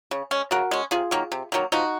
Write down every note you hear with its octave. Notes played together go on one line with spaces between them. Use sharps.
C#3
G#3 C#4
C#3 F#4 A#4
G#3 C#4
C3 F4 G#4
D#3 F#3 A#3
C3
D#3 F#3 A#3
F3 D#4 F#4